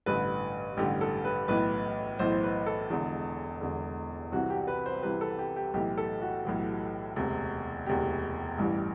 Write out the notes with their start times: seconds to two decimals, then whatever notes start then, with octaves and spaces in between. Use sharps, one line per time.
0.06 A1 G2 D3 B4
0.77 A1 G2 D3 G4
1.01 A4
1.24 B4
1.48 B1 A2 E3 B4
2.19 B1 A2 E3 C5
2.32 C5
2.43 B4
2.66 A4
2.90 E1 E2 D3
3.61 E1 E2 D3
4.32 C2 C3 E3 F#4
4.50 G4
4.67 B4
4.86 C5
5.03 C2 C3 E3 B4
5.21 A4
5.39 G4
5.56 G4
5.74 B1 A2 E3 G4
5.98 A4
6.22 F#4
6.45 B1 A2 E3
7.16 E1 D2 C3
7.86 E1 D2 C3 G4
8.58 A1 G2 E3